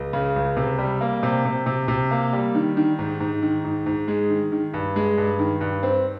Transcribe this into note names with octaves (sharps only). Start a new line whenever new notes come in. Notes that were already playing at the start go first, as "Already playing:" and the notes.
Already playing: C#2
C#3
C#2
C3
G3
A#3
C3
C3
C3
C3
A#3
G3
D#3
D#3
G#2
G#2
D#3
G#2
G#2
G#3
D#3
D#3
G2
G#3
G2
D#3
G2
C4